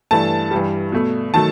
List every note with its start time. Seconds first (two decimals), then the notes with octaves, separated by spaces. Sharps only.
0.11 G2 E3 A3 A5
0.51 G2 E3 G3
0.92 B2 A3
1.34 D#3 F#3 A3 A5